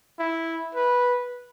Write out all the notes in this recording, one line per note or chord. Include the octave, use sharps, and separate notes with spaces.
E4
B4